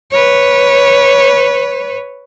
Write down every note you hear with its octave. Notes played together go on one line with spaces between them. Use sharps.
B4 C#5